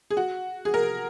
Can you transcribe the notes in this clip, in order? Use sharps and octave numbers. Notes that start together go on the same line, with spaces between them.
G#4
F#4
G#4
A#4